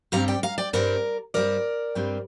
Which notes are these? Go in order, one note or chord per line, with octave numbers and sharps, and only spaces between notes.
G2 G3 C4 F5 A#5
D5 G5
F5 A#5
D5 G5
G2 G3 C4 A#4 D5
G2 G3 C4 A#4 D5
G2 G3 C4